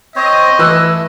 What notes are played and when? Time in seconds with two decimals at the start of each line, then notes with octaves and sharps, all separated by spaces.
0.16 C4 C5 C#5 D#5
0.59 E3 A3 E4 E6 F#6